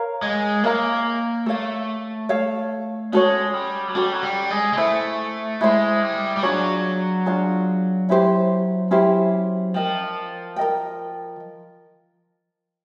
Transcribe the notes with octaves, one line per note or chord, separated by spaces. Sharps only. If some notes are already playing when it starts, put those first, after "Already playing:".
Already playing: A#4 C#5 F5 A#5
G#3
A#3 A#4 C#5 F5 A#5
A3 A4 C#5 F5
A4 C#5 F5
G#3 C#4 F#4 A4 C#5
G3
F#3
G3 C#4 F#4 A4 C#5
F#3
G3
G#3
G#3
A3 E4 A4 C5
G#3 E4 A4 C5
G3
G3
F#3 D4 F4 G#4 C#5
D4 F4 G#4 C#5
C#4 E4 G4 C5
C#4 E4 G4 C5
F3 A#4 D#5 G5
A#4 D#5 G5